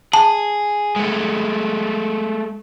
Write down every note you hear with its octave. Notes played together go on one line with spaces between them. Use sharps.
G#4 A5
G#3 A3